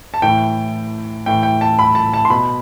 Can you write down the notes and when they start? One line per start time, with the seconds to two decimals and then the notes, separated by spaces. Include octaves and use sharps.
0.14 A5
0.22 A2 E3 G5
1.26 A2 E3 G5
1.43 G5
1.61 A5
1.79 B5
1.95 A5
2.14 A5
2.25 C6
2.30 B2 B5